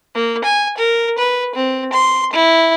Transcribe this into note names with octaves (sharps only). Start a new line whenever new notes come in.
A#3
G#5
A#4
B4
C4
C6
E4